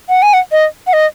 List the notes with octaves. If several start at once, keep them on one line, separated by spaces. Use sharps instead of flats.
F#5
G#5
F#5
D#5
F#5
D#5